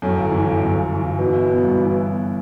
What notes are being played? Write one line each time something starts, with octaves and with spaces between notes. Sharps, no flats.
F#2 A2
G1
E3
G1
F#2
G1
E3
G1
B2 E3
E4
B3
G2
E3
E4
B3